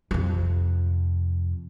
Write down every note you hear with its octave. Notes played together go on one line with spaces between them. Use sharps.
F2 C3